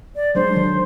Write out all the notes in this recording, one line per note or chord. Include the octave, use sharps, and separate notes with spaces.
D5
F#3 G#3 D4 C5
D3 D#3